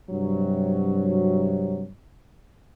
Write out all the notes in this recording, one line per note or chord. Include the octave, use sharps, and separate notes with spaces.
G2 C3 F#3